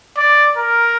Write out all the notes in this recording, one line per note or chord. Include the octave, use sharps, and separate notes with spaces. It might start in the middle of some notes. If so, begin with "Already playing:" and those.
D5
A#4